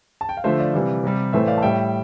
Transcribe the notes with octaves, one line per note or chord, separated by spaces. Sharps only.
A5
G5
F5
D3 F3 A3 C5 E5
D5 F5
C3 E3 G3
C3 G3
A2 E3 A3 C5 E5
D5 F5
A5
A2 G3 E5 G5